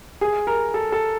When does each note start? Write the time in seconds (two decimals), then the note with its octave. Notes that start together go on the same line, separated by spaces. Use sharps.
0.21 G#4
0.47 A#4
0.74 A4
0.92 A4